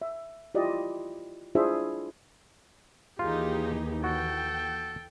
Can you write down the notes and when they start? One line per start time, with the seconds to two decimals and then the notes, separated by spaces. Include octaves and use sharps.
0.02 E5
0.55 E4 F4 G4 D5 D#5
1.55 D4 E4 F4 G#4 C5 E5
3.19 D#2 E3 D#4 F4 G4 G#4
4.04 F#4 A4 G5